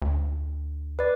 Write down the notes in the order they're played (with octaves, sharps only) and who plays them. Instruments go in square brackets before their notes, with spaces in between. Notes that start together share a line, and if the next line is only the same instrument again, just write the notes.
[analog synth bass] D2
[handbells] B4 D5